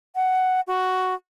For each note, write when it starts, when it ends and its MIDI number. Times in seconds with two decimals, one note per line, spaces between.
0.15 0.60 78
0.67 1.14 66